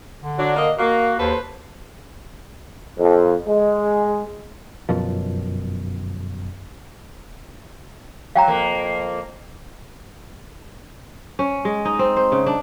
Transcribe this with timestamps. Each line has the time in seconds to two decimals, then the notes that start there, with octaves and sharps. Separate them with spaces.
0.20 D3
0.39 F#3 D4
0.56 A#3 D#5
0.79 A#3 F#4
1.20 D#2 A4 B4 C5
2.99 F2
3.47 G#3
4.89 G1 F#2 B2 F3
8.36 F#3 F5 G5 A#5
8.47 F2 A#3
11.39 C#4
11.65 G#3
11.85 D#4
11.99 C4
12.17 C5
12.32 C#3
12.46 D4